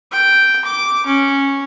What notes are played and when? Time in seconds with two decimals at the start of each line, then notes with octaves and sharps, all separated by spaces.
0.12 G5
0.65 D6
1.07 C#4